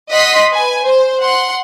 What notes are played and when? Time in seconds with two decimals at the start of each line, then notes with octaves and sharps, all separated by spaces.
0.11 D#5 F#5 C6 D#6 B6
0.53 B4 G#5
0.82 C5
1.19 F#5 C6